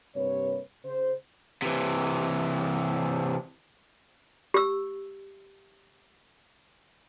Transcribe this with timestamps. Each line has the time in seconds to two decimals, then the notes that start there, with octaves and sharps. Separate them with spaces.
0.16 G2 C3 A#3 C4 B4 C#5
0.85 C#3 C5
1.62 C3 E3
4.54 G4 E6